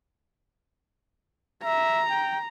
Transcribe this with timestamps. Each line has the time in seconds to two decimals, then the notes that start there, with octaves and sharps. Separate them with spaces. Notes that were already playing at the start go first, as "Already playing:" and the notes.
1.64 E5 A#5
2.10 G5